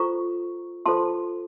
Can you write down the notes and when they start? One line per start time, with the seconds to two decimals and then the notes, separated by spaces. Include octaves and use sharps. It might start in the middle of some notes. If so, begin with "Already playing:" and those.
Already playing: F4 A4 C5 A#5 C#6
0.86 F4 A4 C5 A5 C6